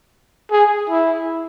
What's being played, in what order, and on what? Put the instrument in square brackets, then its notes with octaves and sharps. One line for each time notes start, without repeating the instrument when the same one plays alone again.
[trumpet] G#4
E4